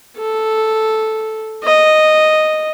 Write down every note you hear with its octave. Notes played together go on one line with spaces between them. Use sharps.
A4
D#5